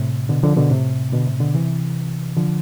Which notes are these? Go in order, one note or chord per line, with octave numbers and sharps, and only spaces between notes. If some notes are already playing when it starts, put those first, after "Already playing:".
Already playing: A2 C3
B2 D3
D3 F3
B2 D3
A2 C3
B2 D3
A2 C3
B2 D3
C3 E3
D3 F3